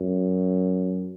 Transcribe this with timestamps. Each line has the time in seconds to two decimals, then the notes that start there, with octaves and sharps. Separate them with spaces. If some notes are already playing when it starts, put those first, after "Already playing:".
Already playing: F#2